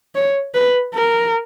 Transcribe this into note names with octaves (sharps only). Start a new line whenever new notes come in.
C#5
B4
A#4